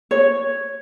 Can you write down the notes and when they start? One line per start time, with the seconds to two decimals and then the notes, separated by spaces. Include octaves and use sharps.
0.11 C#5